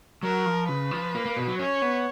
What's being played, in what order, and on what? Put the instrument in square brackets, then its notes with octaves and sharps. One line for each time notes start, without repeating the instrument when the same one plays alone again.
[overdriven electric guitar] F#3 [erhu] A#4
[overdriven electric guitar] F3
[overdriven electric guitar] C#3 [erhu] B4
[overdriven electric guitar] F3
A#3
A#3
B2
F#3
[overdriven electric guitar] C#4 [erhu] C#5
[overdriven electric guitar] B3